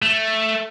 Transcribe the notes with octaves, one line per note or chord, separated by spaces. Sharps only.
A3